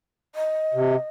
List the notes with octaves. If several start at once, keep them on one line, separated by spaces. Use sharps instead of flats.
D#5
C3